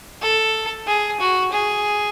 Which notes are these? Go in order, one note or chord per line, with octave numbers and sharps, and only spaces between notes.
A4
G#4
F#4
G#4